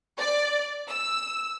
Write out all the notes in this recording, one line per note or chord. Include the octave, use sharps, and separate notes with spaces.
D5
E6